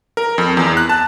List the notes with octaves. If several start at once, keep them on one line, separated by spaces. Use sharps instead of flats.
A#4
F2
E2
F#6
A5